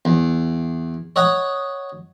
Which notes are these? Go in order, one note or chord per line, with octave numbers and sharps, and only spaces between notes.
E2
C#5 D#5 F#5 A#5